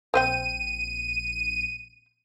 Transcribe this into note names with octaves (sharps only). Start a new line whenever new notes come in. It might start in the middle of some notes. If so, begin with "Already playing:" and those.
A#1 C4 C5 G5 D#7